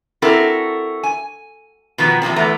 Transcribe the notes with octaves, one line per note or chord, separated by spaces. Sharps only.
C4 E4 F#4 A4 A#4
G#5
B2 D#3 F3 B3
E2 C3 F3 C4
E2 A3 B3 A#5